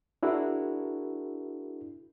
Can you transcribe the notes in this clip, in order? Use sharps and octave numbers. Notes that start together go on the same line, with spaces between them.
D4 E4 F#4 G#4 A#4